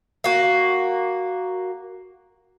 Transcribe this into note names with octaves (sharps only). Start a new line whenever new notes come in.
A#3 F#4